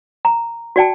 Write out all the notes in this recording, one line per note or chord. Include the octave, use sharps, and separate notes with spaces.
A#5
F#4 D5 G5 A5